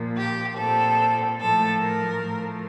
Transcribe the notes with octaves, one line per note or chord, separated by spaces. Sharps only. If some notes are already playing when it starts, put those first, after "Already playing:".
Already playing: A#2 F3 A#3
G4
A#2 F3 C4 A4
A2 F3 A3 A4
A#4
A2 F3 A3